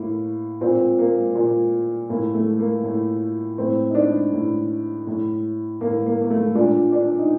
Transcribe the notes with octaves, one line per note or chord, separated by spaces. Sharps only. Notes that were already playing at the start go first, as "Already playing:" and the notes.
Already playing: A2 A#3
A#2 C4
A#3
A#2
A2 A#3
A3
A#3
A2
A2 C4
D#4
D4
A2
A2
A2 A#3
A#3
A#3
A3
A#2 D4
D4
D#4